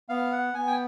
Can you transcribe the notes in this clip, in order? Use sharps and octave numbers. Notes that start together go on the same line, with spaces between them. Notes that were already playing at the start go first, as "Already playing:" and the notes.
B3 F5
F#5
B3 G#5
G5